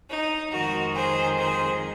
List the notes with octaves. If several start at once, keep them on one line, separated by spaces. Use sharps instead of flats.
D#4
F2 D#3 G#3 F#4 A#4
G#4 C5
G#4 C5